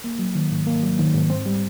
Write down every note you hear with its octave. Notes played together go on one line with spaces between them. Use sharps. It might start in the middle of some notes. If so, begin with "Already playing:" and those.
A#3
F#3
D#3
G#2
A#3
F#3
D#3
G#2
C4
G3